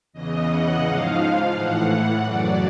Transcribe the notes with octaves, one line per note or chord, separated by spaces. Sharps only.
E2 C#3 E3 D#5
F#5
G#2 F3 F5
A2 E3 F#5
F#2 C#3 F#3 D5